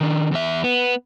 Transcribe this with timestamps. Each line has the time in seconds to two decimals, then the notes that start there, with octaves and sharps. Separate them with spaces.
0.01 D#3 D4
0.32 E2 E5
0.64 B3